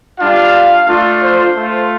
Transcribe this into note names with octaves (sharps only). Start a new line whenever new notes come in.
G3 D4 F4 F5
A3 D4 F4
C5
A3 F4